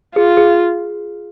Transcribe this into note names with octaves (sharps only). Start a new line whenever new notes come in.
F4 G#4
G#4